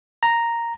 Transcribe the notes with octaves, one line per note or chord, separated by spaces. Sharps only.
A#5